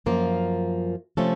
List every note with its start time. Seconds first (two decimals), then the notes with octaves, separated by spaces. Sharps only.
0.06 F#2 F3 A#3 F4
1.17 C3 F3 A3 C#4 A4